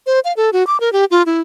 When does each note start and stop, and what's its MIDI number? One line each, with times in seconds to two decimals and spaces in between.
0.06 0.20 72
0.25 0.33 77
0.37 0.50 69
0.53 0.66 66
0.67 0.80 86
0.80 0.92 70
0.93 1.05 67
1.11 1.23 65
1.26 1.40 64